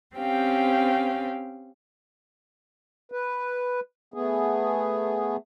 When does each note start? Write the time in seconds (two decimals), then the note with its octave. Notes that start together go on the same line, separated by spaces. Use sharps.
0.16 C4 C#4 G4 F5 G5
3.12 B4
4.14 A3 B3 G#4